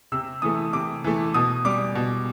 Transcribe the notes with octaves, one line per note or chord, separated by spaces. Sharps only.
C3 E6
E3 A3 D#6
C3 D6
E3 A3
B2 D#6
G3 D6
B2